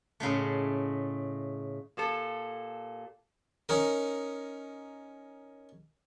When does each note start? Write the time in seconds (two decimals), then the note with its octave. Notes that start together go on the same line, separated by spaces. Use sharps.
0.20 A2 C#3 G#3 A3
1.97 A#2 G4 A4
3.69 C#4 D#4 A#4